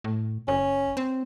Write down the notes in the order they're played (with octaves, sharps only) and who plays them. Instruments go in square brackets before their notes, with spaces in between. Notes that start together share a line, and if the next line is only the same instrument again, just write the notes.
[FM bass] A2
[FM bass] F#1 [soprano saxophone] C#4
[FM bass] C4